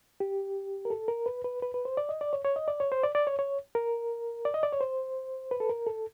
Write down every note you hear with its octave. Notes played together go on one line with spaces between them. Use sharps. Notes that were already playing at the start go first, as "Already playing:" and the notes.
G4
A#4
A4
A#4
B4
B4
B4
B4
C5
D5
D#5
D5
C#5
C#5
D#5
D5
C#5
C5
D5
D5
C#5
C#5
A#4
D5
D#5
D5
C#5
C5
B4
A4
A#4
A4